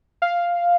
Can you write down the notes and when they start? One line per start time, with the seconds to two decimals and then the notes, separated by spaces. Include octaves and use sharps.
0.22 F5